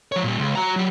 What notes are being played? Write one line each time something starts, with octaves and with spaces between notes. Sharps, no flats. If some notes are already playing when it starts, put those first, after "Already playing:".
F3 C#5
A#2 G3
C#2
F#4 A#5
F#3 G3